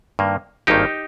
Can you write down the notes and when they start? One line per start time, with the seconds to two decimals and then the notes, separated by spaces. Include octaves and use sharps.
0.19 G2 D#3 A#3
0.67 G#1 G2 D#3 A#3 D#4 G4